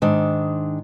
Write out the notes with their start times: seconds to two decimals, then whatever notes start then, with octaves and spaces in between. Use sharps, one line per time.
0.02 G#2 D#3 D4